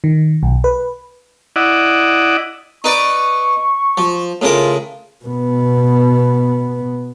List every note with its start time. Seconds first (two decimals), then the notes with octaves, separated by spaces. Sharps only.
0.04 D#3
0.43 B1
0.64 B4
1.56 E4 D5 D#5 F#5
2.84 D#4 B4 D5 C#6
3.98 F3
4.42 A2 C#3 F4 A#4
5.25 B2 B3